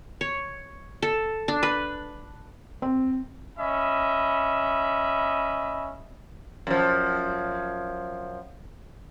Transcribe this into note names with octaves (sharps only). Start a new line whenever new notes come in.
C#5
A4
D4
B4
C4
C#4 D#5 E5 B5
F#2 F3